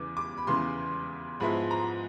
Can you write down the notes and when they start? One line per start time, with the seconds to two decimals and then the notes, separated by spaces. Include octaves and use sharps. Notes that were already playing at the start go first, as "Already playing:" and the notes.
Already playing: E2 C#3 E3 D6
0.17 D6
0.38 B5
0.47 E2 C#3 E3 C6
1.40 G#2 F3 G#3 B3 E4 B5
1.71 A#5